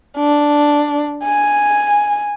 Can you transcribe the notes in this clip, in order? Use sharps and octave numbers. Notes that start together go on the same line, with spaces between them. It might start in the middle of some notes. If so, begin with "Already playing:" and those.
D4
G#5